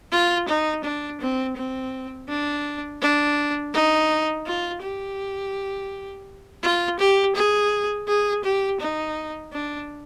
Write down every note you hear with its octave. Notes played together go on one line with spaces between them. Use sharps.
F4
D#4
D4
C4
C4
D4
D4
D#4
F4
G4
F4
G4
G#4
G#4
G4
D#4
D4